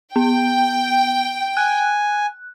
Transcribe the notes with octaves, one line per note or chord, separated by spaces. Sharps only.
B3 G5
G#5 F#6